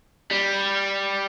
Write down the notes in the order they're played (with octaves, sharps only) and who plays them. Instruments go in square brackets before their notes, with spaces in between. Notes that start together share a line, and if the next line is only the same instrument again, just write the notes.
[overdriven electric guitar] G3